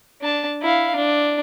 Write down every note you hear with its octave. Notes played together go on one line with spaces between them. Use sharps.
D4 A5
E4 F5
D4